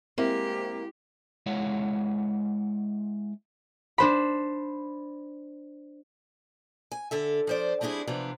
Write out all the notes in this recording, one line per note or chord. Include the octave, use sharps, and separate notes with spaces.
G#3 A#3 C4 E4 G4
G#3 E4 C#5 F5 F#5
D4 C5 B5
G#5
D3 A4 E5
F3 C5 D5
G3 C4 D4 E4 G#4
C3 E3 F3 B3 D4